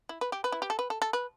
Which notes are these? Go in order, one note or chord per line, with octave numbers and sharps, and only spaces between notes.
E4
B4
G4
B4
E4
G4
A4
B4
A4
A4
B4